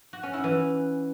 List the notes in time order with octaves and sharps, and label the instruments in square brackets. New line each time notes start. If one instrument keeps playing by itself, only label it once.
[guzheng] F#4
C#4
E4
E3